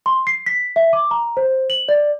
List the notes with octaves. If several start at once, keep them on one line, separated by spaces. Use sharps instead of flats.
C6
C7
B6
E5
D6
A#5
C5
F#7
D5